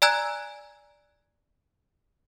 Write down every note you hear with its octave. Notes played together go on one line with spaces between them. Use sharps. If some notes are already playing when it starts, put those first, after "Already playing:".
D5 G#5 A#5 E6 F#6 G#6